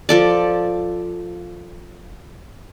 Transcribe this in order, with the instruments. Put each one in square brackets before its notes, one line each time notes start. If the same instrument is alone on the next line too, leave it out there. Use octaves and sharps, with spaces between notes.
[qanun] F3 A4 D5